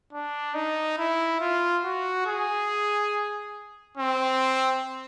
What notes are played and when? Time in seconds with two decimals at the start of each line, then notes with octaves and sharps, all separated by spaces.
0.13 D4
0.55 D#4
0.98 E4
1.40 F4
1.84 F#4
2.26 G#4
3.97 C4